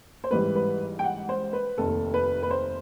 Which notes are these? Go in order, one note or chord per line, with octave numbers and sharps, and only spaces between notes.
C5
A1 G#2 E3 G3 B4
B4
G5
F#5
C5
B4
F1 D#2 D#3 A4
B4
B4
C5